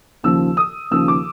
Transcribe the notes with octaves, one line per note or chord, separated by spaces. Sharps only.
D#2 C#3 F3 E6
D#6
D#2 C#3 F3 E6
D6